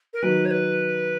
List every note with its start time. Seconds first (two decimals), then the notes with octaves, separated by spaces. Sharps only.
0.13 A#4
0.22 D#3 F#3 B4
0.45 C#5
0.51 B4